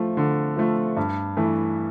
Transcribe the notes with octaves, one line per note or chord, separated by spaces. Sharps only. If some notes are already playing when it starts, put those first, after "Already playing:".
Already playing: F3 A3
D3
F3 A3
G2
E3 A3